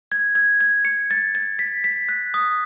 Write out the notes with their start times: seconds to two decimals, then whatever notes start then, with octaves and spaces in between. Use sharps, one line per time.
0.12 G#6
0.35 G#6
0.60 G#6
0.85 C#7
1.11 A6
1.35 A6
1.59 B6
1.84 B6
2.09 F#6
2.34 D#6